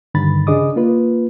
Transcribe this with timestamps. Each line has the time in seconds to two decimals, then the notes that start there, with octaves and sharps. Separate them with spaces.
0.14 G2 D3 D#3 B5 A6
0.47 C#3 D4 G#4 D#5 D6 D#6
0.76 A#3 F4 B4